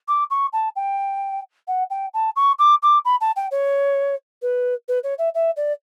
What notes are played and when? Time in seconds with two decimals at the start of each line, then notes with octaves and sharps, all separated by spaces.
0.08 D6
0.30 C#6
0.53 A5
0.76 G5
1.68 F#5
1.90 G5
2.14 A5
2.36 C#6
2.59 D6
2.83 D6
3.05 B5
3.21 A5
3.36 G5
3.51 C#5
4.42 B4
4.88 B4
5.04 C#5
5.18 E5
5.35 E5
5.57 D5